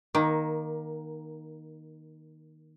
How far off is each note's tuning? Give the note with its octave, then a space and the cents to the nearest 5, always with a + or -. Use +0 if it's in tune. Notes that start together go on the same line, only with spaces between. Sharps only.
D#3 +0 A#3 +20